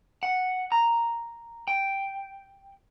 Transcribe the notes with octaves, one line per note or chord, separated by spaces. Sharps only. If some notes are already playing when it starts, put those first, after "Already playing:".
F#5
A#5
G5